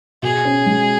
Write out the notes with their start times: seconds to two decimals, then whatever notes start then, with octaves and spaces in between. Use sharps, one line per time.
0.23 B2 G#4
0.45 C#4
0.66 G#3